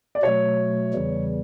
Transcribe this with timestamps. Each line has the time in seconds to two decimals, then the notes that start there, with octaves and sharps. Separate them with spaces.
0.15 D5
0.23 B2 F#3 A3 C#5
0.93 E2 C#3 E3 G3